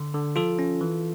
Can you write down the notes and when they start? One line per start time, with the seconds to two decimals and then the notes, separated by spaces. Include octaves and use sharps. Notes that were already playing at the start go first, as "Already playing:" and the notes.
Already playing: D3
0.14 D3
0.36 F3 F4 A4
0.59 C#4
0.81 E3